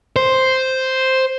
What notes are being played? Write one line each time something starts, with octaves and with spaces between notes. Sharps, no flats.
C5